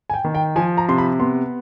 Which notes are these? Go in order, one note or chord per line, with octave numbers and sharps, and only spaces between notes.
G#5
G5
D#3
G5
F3 G#5
A#5
C3 C6
B5
B3 C6